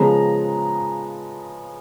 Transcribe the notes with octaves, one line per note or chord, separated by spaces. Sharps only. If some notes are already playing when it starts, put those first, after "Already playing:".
Already playing: C#3 F3 G#3 B3 A#5